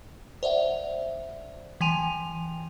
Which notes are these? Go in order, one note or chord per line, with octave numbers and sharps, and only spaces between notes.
C5 D5 E5 F#5
E3 G5 G#5 C6 D#7 F7